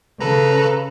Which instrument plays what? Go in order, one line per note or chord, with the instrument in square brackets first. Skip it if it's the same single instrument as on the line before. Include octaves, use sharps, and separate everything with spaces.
[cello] C#3 [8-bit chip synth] A4 B4 A#5